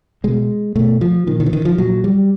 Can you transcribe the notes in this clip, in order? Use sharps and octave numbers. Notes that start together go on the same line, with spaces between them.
B2 G#3
B2 A3
F3
A#2 D#3
D#3
E3
D#3
F3
A#2 F#3
G3